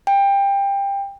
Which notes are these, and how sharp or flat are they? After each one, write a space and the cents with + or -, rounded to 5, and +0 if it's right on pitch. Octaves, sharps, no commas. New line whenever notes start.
G5 +20